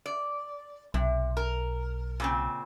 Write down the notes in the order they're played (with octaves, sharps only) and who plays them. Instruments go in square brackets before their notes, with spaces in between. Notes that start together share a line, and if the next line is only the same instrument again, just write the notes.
[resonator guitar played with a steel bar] D5
[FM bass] B1 [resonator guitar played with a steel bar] C3
[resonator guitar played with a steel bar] A#4
A#2 C#3 C4